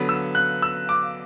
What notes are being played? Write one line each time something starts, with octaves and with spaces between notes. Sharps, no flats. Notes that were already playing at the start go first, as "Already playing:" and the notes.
Already playing: D3 F#3 B3
E6
F#6
E6
D6